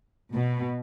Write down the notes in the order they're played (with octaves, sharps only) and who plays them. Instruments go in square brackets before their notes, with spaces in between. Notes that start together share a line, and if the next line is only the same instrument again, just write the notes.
[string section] B2